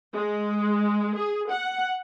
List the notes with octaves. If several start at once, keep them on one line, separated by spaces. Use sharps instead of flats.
G#3
G#4
F#5